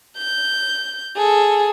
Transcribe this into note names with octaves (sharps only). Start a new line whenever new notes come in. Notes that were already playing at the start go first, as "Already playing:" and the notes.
G6
G#4 A4